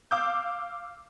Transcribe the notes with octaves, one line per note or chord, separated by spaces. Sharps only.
F5 D6 E6 G6